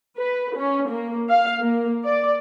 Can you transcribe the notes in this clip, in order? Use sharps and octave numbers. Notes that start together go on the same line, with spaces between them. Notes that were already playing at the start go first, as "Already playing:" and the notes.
B4
C#4
A#3
F5
A#3
D5